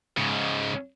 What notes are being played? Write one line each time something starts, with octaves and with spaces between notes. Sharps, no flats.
G#2 C#3